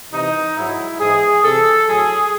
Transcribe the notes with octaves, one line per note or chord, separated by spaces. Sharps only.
C3 E3 D#4
G#2 F#3 E4
G#2 E3 G#4
C3 E3 A4
A2 F#3 G#4